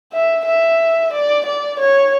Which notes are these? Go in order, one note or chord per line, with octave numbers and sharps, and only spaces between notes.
E5
E5
D5
D5
C#5